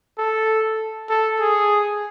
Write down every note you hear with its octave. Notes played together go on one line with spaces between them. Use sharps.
A4
A4
G#4